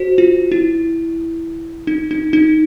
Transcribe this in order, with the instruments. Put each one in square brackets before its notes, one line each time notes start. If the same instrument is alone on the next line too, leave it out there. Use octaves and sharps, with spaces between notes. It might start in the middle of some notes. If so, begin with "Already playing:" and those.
Already playing: [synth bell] F#4 C5
F4
E4
D#4
D#4
D#4